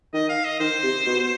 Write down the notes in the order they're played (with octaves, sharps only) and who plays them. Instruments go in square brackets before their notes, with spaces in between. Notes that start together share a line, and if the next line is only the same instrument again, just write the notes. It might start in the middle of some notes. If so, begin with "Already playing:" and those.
[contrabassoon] D#3 [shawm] D#5
[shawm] F5
D#5
[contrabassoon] D#3 [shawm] C5
[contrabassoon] C3
B2